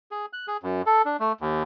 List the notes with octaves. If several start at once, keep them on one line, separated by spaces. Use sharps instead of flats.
G#4
F#6
G#4
F#2
A4
D4
A3
D#2